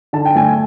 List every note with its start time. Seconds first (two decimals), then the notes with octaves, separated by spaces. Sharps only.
0.13 D3 A5
0.26 G5
0.36 A3 G#5